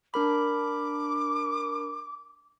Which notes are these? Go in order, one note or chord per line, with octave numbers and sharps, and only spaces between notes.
D4 A#4 B5 D6